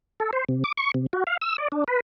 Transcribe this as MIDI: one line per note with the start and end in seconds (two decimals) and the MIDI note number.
0.20 0.31 69
0.33 0.44 72
0.49 0.64 48
0.64 0.72 86
0.77 0.91 85
0.94 1.06 48
1.13 1.24 66
1.27 1.37 77
1.41 1.56 88
1.58 1.68 74
1.72 1.84 62
1.88 2.00 71